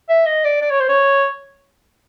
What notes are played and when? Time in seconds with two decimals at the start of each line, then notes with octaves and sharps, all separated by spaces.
0.09 E5
0.26 D#5
0.44 D5
0.61 D5
0.71 C#5
0.80 C5
0.89 C#5